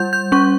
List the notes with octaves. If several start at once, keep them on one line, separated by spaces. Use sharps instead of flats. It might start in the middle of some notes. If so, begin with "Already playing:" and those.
Already playing: G3 G6
G6
C#4 C#6